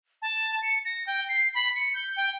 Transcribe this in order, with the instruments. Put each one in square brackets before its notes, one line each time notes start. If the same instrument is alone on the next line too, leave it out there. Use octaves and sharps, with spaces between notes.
[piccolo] A5
C#7
A#6
G5
C7
B5
C#7
G6
G5